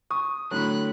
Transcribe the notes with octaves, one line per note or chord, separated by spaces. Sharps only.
C#6 D#6
A2 D3 F#3 B5 F#6